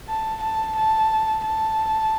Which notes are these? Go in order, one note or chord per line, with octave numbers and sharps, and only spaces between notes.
A5
A5
A5
A5